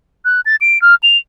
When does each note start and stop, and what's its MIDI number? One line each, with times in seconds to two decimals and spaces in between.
0.25 0.41 90
0.46 0.56 93
0.61 0.81 98
0.82 0.95 89
1.03 1.17 101